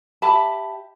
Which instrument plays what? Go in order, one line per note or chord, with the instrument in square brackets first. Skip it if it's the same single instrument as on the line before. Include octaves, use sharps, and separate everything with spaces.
[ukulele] G4 E5 A5 B5